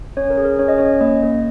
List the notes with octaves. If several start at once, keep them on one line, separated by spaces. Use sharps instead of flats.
C#4 C#5
A#4
G#4
A#4
C#4 C#5
D#5
C#4 C#5
A#3 D#5
A#3